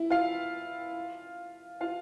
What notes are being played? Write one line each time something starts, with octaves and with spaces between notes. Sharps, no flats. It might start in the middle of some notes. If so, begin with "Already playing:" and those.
Already playing: E4
F4 F5
F4 F5